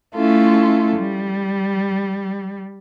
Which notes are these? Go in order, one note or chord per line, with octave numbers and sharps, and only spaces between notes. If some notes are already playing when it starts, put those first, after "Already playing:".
A3 C#4 E4 F4 A4
G3